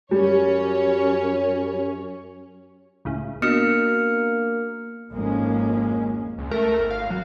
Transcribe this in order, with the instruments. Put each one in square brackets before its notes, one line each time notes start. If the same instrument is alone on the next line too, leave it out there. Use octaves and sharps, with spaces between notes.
[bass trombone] F#2 [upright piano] G3 [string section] C#4 C#5
[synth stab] C#2 A2 C#3
[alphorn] A#3 [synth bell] B3 D4 F#4 [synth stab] D#5 [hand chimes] F6 C#7
[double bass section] G#1 F2 G#3 A#3 C#4
[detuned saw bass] C#2
[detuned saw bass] A3 [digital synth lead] A#4
[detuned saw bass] G#1
[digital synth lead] F5
F#3